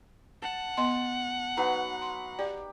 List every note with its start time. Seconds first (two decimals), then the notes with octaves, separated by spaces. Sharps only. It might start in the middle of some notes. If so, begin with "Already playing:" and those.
0.42 F#5 A5
0.77 B3 D#5 C6
1.57 F#3 D#4 B4 A#5
2.02 C6
2.39 G4 D5